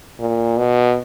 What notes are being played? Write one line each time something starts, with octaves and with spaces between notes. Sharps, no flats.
A#2
B2